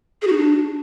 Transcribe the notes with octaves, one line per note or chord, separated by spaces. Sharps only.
G#4
F#4
D#4
D4